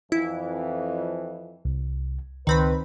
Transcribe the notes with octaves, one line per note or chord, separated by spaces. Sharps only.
F2 E3 E4
C2
C#2 D#3 C4 B4 B5